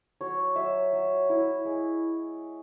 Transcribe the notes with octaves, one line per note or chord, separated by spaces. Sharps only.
F#3 C#5
F#3 E5
F#3
E4
G#3